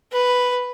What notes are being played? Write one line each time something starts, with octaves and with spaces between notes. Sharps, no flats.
B4